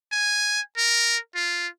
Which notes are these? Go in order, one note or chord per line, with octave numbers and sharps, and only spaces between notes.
G#5
A#4
F4